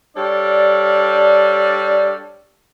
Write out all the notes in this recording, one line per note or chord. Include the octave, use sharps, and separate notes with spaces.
G3 D4 A4 C#5 D5 F5